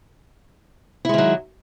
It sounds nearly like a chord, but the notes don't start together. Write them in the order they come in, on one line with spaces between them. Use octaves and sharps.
E4 G#3 D#3 F#3